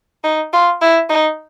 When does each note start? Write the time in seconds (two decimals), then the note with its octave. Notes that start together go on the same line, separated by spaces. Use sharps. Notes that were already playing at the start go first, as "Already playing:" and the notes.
0.24 D#4
0.53 F4
0.82 E4
1.10 D#4